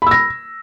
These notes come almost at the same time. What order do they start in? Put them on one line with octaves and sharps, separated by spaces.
B5 E6 A#6